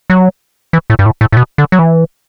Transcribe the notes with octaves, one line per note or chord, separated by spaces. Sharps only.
F#3
E3
A2
G2
A2
A2
A2
B2
D3
F#3
E3